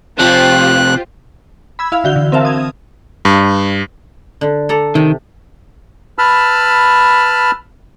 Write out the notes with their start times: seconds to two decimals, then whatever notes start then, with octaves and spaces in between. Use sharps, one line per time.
0.19 C3 F3 F4 G4 C5 F#6
1.79 B5 E6 G#6
1.92 E4 F5
2.04 D3 E3 F#4 G6 G7
2.16 D3
2.32 C4 A#4 E5 F5 A5
2.45 D#6 G#6
3.25 G2
4.41 D3
4.69 A4 D5 A#5
4.95 C3 D#3
6.18 B4 A5 B5 E6 F6